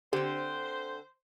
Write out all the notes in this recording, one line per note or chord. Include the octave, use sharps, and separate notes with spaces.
D3 C4 G4 C5